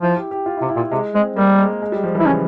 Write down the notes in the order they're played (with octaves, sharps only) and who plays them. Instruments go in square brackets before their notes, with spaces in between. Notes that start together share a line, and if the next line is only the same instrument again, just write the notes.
[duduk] F3 [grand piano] E4
[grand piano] G4
G4
F4
E4
[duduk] C3
[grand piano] E4
[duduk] A#2
[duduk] C3 [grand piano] G#3
[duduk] G#3 [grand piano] C4
[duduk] G3 [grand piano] A#3
[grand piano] A#3
G#3
G#3
G3
F3
[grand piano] E3 [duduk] E4
[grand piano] C#3 [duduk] C#4